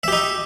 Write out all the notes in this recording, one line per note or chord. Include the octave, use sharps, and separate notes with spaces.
D#4 G4 E5